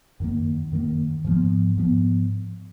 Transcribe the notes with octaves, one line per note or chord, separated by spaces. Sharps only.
F#2 D#3 A#3
F#2 D#3 A#3
G#2 F3 B3
G#2 F3 B3